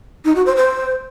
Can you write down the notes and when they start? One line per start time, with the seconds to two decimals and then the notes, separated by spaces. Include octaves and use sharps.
0.25 D#4
0.35 F#4
0.46 C5
0.56 C5